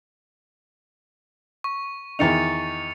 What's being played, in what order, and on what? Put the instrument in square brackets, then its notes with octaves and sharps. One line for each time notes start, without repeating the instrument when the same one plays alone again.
[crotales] C#6
[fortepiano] E2 D#3 D#4 [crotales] A6 C#7 F7